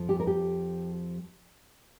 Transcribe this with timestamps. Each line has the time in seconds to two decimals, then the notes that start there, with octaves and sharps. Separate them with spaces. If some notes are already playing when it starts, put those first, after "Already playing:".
Already playing: F2 F3
0.09 G4
0.20 A#4
0.27 G4